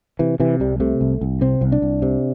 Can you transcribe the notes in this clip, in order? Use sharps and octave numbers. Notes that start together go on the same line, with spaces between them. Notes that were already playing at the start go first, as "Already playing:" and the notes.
C3 E3
C3 E3
C2 G3
C3 A3
C2
C2
C3 C4
C2
D4
C2
C3